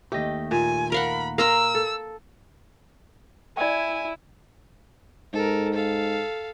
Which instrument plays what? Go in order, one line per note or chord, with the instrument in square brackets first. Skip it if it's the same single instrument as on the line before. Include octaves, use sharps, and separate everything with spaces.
[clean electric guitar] D#2 A3 [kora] G4 D#5
[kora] A#2 [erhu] G#5
[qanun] A#4 F5 F#5 [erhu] B5
[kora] A#4 [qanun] F5 A#5 C6 [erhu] E6
[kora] A4
[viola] E4 [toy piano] D5 G5 [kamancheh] G#5
[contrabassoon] G#2 [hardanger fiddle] A4 A#4
[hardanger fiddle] A4 F5